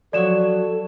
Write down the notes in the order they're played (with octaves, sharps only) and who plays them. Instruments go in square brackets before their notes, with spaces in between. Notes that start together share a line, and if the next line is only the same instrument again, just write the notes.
[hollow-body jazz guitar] F3 F#3 C#5 [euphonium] A4 [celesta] D5 E7